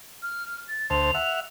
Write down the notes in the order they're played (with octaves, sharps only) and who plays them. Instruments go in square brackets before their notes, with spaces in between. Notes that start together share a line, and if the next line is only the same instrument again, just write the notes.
[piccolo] F6
A6
[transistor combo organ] D2 C5 A5 [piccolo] F7
[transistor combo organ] E5 F#5